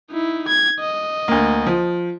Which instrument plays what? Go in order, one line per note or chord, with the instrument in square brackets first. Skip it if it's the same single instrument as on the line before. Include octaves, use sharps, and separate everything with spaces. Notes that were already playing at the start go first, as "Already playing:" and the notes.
[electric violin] D#4 E4
G#6
D#5
[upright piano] D2 A#3
F3